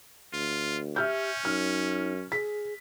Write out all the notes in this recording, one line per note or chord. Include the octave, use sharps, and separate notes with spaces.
D2 F4
C#4 G4 E5 F6 G6
F#2 D#4 F6
G#4 B6